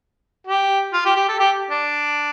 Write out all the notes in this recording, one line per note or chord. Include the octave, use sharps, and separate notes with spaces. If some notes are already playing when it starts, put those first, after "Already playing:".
G4
F4
G4
G4
A4
G4
D4